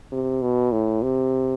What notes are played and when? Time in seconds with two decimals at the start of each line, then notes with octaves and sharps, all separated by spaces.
0.12 C3
0.42 B2
0.72 A2
1.02 C3